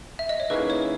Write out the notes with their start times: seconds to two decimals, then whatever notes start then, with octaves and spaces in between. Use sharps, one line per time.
0.19 E5
0.29 D#5
0.40 C#5
0.50 D#3 A#3 C#4 E4 G#4 B4
0.70 C#5